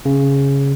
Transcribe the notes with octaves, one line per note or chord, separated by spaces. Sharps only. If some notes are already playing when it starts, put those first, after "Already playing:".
C#3